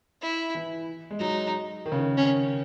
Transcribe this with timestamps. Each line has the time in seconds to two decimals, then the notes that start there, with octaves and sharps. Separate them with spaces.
0.22 E4
0.55 E3
1.10 G#3
1.19 F#3 D#4
1.86 D#3
1.92 C#3
1.99 D#3
2.17 C#4